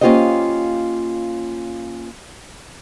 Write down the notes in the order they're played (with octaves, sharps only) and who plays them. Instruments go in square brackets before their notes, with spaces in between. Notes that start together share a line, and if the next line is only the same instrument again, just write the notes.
[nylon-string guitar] A#3 C#4 F4 G4 C5 D#5